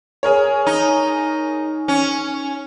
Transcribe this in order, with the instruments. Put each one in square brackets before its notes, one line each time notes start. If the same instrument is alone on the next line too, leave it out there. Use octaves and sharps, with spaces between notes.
[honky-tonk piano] G#4 A#4 C#5
[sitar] D#4
C#4